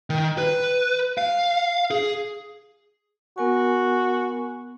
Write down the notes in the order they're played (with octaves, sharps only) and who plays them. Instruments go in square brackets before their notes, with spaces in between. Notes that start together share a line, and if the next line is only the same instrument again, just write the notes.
[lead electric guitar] D#3
B4
F5
G#4
[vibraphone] B3 A#4 G#5 [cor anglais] F#4